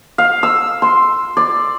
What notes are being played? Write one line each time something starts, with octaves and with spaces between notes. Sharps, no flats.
F5
E6
C6
D5